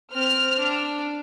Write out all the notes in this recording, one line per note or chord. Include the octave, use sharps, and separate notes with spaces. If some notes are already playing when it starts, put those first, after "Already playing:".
C4 F6
D4